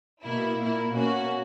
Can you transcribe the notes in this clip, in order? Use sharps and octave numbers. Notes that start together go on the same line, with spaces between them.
B2 A#3 E4
A#2 A#3 E4
B2 A#3 C#4 F#4